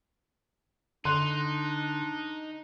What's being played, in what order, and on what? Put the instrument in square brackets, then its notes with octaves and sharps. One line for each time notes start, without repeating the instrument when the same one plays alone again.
[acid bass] D3 [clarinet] D4 [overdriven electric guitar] D#4 [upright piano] C6 F#6